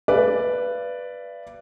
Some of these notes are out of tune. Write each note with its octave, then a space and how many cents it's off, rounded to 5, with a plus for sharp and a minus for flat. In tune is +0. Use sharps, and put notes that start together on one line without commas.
B4 +0 D5 +0 F5 -45